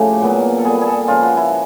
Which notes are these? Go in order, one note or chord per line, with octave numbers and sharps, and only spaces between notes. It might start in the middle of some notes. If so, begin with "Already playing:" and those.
Already playing: A2 C#3 F3 A3 G4
A#2 F#3 B3
A4
A#2 G3 B3 G#4
G#4
A4
C#3 F3 G#3 F4
F#4
E4